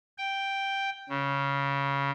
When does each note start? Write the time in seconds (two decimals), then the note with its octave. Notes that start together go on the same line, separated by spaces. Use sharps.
0.18 G5
1.09 C#3